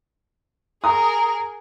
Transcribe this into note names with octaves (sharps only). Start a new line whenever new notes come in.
G#4 A#4 A#5 D#6